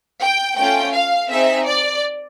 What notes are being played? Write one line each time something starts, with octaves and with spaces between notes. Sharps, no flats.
G5
A3 C#4 F4 G5
F5
C4 D#4 G#4 E5
D5